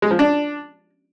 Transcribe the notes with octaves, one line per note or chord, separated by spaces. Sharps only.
G#3
F3
D4